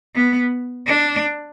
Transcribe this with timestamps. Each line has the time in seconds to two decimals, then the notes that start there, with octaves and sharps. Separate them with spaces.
0.15 B3
0.86 D4